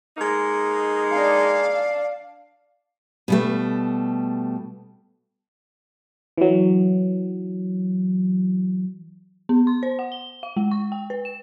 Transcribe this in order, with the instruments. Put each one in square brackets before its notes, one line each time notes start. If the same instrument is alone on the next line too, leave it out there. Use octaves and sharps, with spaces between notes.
[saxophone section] G#3 A#3 D#4
[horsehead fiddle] D4 [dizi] F5
[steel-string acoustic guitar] B2 G3 A3
[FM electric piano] E3 F#3
[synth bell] B3
C6
C5
F#5
G7
F5
G#3
C#6
G5
B4
E7